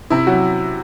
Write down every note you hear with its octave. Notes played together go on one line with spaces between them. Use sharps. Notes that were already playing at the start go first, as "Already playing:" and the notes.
C3 E4
F#3 F#4